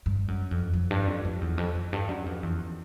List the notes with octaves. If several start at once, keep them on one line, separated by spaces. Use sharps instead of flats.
G2
F#2
F2
F2
G2
F2
F2
E2
F2
F2
G2
F#2
F2
E2